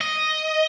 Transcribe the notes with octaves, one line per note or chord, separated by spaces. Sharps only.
D#5